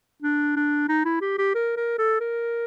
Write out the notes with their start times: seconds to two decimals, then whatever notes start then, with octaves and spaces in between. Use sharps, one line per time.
0.23 D4
0.56 D4
0.88 D#4
1.05 E4
1.21 G4
1.38 G4
1.55 A#4
1.77 A#4
1.98 A4
2.20 A#4